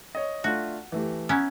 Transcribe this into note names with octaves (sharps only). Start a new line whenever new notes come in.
C#5 D#5
A3 D4 F4 F#4
E3 A3 G4
B3 C#4 E4 A#5